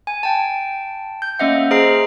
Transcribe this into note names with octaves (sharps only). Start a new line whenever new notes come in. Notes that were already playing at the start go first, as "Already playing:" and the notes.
G#5
G5 A5
G6
A#3 C#4 D#5 E5 F#5
G#4 C5 D#5 A#5 F6 C7